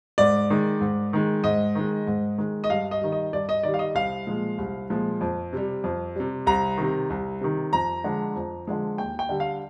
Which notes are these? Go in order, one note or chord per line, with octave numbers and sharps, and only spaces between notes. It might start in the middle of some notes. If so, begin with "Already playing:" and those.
G#2 D5
D#3 G#3
G#2
D#3 G#3
G#2 D#5
D#3 G#3
G#2
D#3 G#3
D#5
G2 F5
D#5
D#3 G3
D#5
G2 D5
D#5
D#3 G3 D5
F5
D#5
C2 F5
A#2 F3 G#3
C2
A#2 F3 G#3
F2
C3 G3
F2
C3 G3
C2 A#5
C3 D#3
C2
C3 D#3
F2 A#5
D3 F3 G#3
F2
D3 F3 G#3
D#2 G5
G5
D3 G3
F5